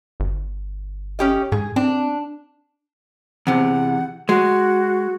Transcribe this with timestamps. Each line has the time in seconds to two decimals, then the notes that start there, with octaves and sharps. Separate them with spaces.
0.20 G1
1.19 C#4 G4 D#5
1.52 G#2 G#4
1.76 C4 D4
3.47 E2 C3 F#5
4.29 G#3 F#4